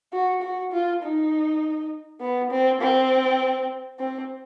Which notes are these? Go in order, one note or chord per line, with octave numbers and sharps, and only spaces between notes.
F#4
F#4
F4
D#4
B3
C4
C4
C4